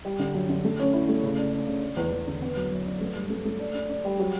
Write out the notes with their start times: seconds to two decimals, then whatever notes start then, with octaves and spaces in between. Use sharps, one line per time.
0.05 G3
0.19 D3
0.34 F#2
0.49 D3
0.64 A3
0.80 C#4
0.94 E4
1.09 A3
1.23 C#3
1.38 D4
1.53 D4
1.68 C#3
1.82 D4
1.97 E2
2.12 E2
2.27 D3
2.42 B3
2.57 F#2
2.71 F#2
2.86 D4
3.01 A3
3.16 G2
3.30 A3
3.45 A3
3.60 D4
3.74 D4
3.90 D4
4.05 G3
4.19 F#3